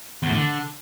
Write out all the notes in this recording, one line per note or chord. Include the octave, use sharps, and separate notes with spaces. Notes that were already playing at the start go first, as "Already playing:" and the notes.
E2
A2
D3